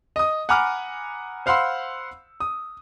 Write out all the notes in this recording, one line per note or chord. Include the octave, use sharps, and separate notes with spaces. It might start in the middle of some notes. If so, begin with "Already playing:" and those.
D#5 D#6
F#5 G#5 A#5 B5 D6 F6
C5 F5 F#5 B5 C6 E6
D#6